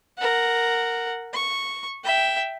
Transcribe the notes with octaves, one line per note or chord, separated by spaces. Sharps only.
A#4 F#5
C#6
E5 G5